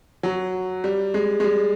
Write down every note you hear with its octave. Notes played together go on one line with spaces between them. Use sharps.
F#3
G3
G#3
G#3
G3